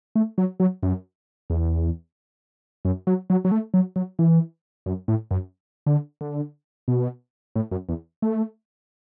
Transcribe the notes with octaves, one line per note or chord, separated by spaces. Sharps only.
A3
F#3
F#3
F#2
E2
F#2
F#3
F#3
F#3
A3
F#3
F#3
E3
F#2
A2
F#2
D3
D3
B2
A2
F#2
E2
A3